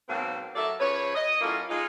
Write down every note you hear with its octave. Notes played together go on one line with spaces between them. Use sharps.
G#2 B2 F#3 A#3 C4
F#3 A3 A#3 A4 D5 E5
C#3 F3 B4 C#5
D#5
F#3 A3 A#3 C#4 E4 F4
G#3 D#4 F4